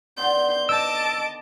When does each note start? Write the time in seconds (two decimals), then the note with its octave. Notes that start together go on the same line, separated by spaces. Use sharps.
0.17 D3 D#3 B3 C6 G6
0.69 D#5 A5 D6 E6 D7